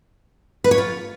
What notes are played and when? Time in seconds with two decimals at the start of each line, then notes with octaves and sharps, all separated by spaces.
0.64 B4
0.71 C#5
0.78 F4